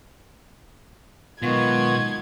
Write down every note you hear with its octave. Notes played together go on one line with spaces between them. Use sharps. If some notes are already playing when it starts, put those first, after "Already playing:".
B2 D#3 F#3 G#3 B3 F4 C#6 G#6